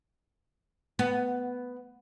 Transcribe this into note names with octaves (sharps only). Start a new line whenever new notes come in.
B3